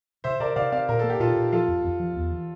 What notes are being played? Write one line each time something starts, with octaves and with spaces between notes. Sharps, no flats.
C3 C5 E5
C3 A#4 D5
C3 D5 F5
C4 D5 F5
A#2 A#4
A#3 A4
G4
A#2 F4 A4
A#2
F3 F4 A4
F2
F2
F3
E2
E3